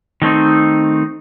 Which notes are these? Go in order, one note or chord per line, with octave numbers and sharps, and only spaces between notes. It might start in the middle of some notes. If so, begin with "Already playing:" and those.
D#3 A3 C4 D#4